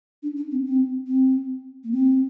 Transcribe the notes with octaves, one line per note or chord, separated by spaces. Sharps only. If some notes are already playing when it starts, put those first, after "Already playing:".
D4
D4
C4
C4
C4
A#3
C4